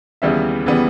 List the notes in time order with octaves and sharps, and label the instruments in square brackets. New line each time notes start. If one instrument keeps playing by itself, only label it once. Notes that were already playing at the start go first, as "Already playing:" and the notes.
[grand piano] D#2 C#3 E3 G3 B3 E5
C#3 E3 G3 B3